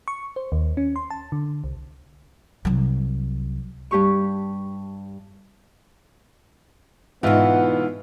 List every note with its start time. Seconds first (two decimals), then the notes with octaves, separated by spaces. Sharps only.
0.08 C#6
0.36 C5
0.52 D#2
0.77 C#4
0.96 C6
1.10 A5
1.32 D3
1.64 C2
2.65 C2 F#3
3.91 G2 G4 C#6
7.23 G#2 B2 E3 B3 E4 F4 F#5